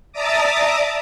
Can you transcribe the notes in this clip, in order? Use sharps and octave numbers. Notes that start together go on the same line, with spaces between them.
D5 E5 A5 A#5 D6 D#6